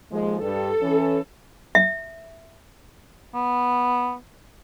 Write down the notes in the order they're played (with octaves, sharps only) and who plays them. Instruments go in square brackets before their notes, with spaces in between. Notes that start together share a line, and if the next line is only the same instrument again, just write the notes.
[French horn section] D#2 F3 G#3
[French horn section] G2 [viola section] A4
[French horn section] E3 C#4
[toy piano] E5
[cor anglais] B3